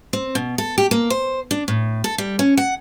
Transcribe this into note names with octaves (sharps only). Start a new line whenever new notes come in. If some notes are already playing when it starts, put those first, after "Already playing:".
C4
B2
A4
G4
A#3
C5
D4
A2
A4
G3
C#4
F#5